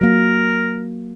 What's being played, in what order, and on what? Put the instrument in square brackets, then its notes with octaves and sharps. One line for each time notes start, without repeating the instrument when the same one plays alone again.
[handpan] F#3 A#3 [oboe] A#4